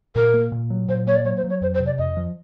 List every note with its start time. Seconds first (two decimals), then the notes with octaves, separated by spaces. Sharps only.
0.16 A#2 A#4
0.34 A#3
0.52 A#2
0.70 F#3
0.88 A#2 C5
1.07 A#3 C#5
1.16 D5
1.25 F#3 C#5
1.37 C5
1.44 F#3
1.50 C#5
1.61 F2 C5
1.74 C5
1.80 C3
1.86 D5
1.98 F2 D#5
2.17 F3